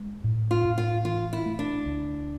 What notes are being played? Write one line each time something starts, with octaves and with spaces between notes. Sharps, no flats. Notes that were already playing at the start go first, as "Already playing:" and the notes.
Already playing: G#3
A2
F4
A2
F4
E3 F4
E4
A3
D4
D2